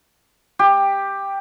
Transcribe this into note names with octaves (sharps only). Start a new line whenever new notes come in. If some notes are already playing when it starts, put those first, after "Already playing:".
G4